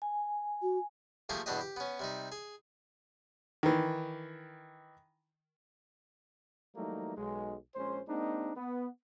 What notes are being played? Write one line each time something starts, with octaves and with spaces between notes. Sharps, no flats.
G#5
F#4
F3 A3 A#3 G4 G#4 C5
E2 G2 B2 D4 G4 D#5
G4
B3 C#4
C3 G3 D#4
G#4
D#3 E3
E3 F#3 G3 A3 A#3 D#4
B1 G#3
A#1 G#3 C#4 C5
G#3 A#3 C4 D4 D#4
B3